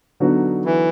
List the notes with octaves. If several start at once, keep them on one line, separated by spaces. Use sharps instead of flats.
D3 F#3 B3 D#4 F#4
E3